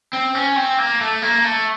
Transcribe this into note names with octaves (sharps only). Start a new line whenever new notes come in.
C4
C#4
C4
A#3
A3
A#3
A3